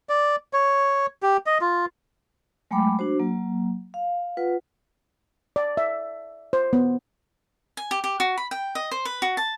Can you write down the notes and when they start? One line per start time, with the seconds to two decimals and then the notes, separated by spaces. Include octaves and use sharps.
0.09 D5
0.53 C#5
1.23 G4
1.46 D#5
1.61 F4
2.71 F#3 G#3 A3 G5 B5 D6
2.99 D4 F#4 C5
3.19 F#3 A#3
3.94 F5
4.37 F4 B4 F#5
5.56 D5
5.77 E5
6.53 C5
6.73 B3
7.77 G#5
7.91 G4
8.04 G4
8.20 F#4
8.38 B5
8.51 G5
8.75 D#5
8.91 C5
9.05 B4
9.22 F#4
9.37 A5